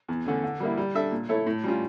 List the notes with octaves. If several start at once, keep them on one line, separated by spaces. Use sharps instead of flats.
E2
D3 A3 C#4
D3
G3 A#3 E4
G3
D4 A4 E5
A#2
A3 E4 A4 C#5
A2
G3 C#4 F4